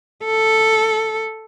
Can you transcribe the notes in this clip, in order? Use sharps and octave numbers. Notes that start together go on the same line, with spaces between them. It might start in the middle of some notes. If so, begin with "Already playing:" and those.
A4